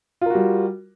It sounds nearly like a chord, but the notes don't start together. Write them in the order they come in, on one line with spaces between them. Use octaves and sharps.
F4 A#4 F#4 G3